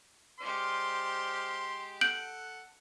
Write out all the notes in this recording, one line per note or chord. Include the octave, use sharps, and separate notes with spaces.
G#3 G4 C5 D5 C6 F6
A4 F#5 G6 D7 F#7